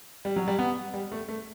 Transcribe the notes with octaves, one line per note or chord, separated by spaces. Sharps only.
G3
F#3
G3
B3
G3
A3
A3